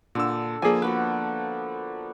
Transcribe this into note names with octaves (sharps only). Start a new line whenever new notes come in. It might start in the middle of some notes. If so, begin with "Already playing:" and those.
A#2 D3 A4 E6
F3 A#3 G#4 D5 G#5
B3 F#4 A4 B4